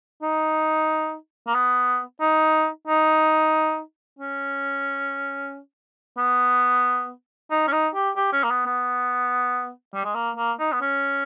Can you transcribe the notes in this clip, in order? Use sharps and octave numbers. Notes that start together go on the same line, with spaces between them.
D#4
A#3
B3
D#4
D#4
C#4
B3
D#4
C#4
D#4
G4
G4
C#4
A#3
B3
B3
G3
G#3
A#3
A#3
D#4
B3
C#4